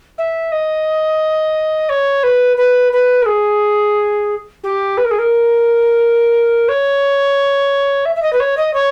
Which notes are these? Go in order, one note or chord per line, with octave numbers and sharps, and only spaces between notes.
E5
D#5
C#5
B4
B4
B4
A#4
G#4
G4
B4
A#4
G#4
A#4
C#5
E5
E5
D#5
B4
C#5
D#5
C#5